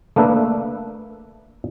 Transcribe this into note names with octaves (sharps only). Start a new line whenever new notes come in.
A3 A#3 D4 B4 E5